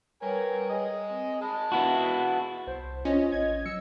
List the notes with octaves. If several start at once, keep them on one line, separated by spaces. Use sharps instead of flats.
G3 A#4 B4 C#5 G5 G#5
G#4 D#5
C4
G#3 A5 B5
B3 E4 F#4
C2 C5
C#4 F4 D#5
A1 G#6
F#3 E6 C#7